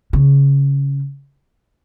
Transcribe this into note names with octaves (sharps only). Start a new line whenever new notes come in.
C#3